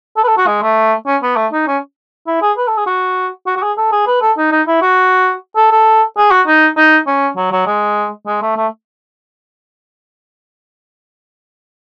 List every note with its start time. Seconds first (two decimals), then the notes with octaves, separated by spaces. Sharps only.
0.17 A4
0.23 B4
0.27 A4
0.38 F#4
0.47 G#3
0.62 A3
1.06 C#4
1.22 B3
1.36 A3
1.52 D#4
1.67 C#4
2.27 E4
2.42 G#4
2.57 B4
2.67 A4
2.77 G#4
2.86 F#4
3.47 F#4
3.57 F#4
3.62 G#4
3.77 A4
3.92 G#4
4.07 B4
4.21 A4
4.37 D#4
4.51 D#4
4.67 E4
4.82 F#4
5.56 A4
5.71 A4
6.17 G#4
6.31 F#4
6.47 D#4
6.77 D#4
7.07 C#4
7.36 F#3
7.52 F#3
7.67 G#3
8.27 G#3
8.42 A3
8.56 A3